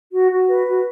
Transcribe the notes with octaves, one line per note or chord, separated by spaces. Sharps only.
F#4
F#4
B4
F#4